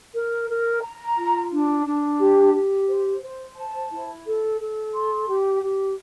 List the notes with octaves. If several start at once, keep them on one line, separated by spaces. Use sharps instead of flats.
A#4
A#4
A#5
F4
D4
D4
G4
G4
C5
C5
A5
E4
A4
A4
C6
G4
G4